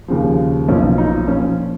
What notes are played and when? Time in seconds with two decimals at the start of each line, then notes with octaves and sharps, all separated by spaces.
0.08 D#2 C#3 F3
0.68 B1 A#2 F3 C#4
0.98 D#4
1.27 A#2 F3 C#4